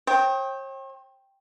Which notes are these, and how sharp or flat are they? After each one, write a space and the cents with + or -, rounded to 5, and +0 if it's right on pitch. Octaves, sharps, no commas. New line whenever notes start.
C#5 -45 G5 +0 D#6 +40